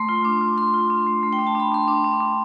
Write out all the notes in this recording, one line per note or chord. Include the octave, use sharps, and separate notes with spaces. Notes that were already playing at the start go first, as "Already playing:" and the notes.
Already playing: A3 C6
F4
D4 D6
F4
D4 C6
F4
D4
A3
A3
G5
D4
A5
D4 B5
D4 C6
D4 D6
D4
D4